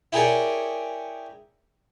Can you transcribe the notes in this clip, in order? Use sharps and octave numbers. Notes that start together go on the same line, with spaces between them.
E4 G4 G#4 A#4 C#5 D5